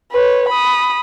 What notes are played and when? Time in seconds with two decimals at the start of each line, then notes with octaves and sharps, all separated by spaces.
0.12 B4 C#5
0.48 B5 D#6